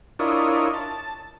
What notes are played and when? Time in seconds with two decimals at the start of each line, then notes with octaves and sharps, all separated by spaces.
0.19 D4 E4 F4 A#4 C#5 D#5
0.74 A5